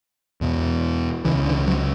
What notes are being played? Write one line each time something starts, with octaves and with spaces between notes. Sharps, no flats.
E2 B2
C#2 C#3 E3
D3
F#3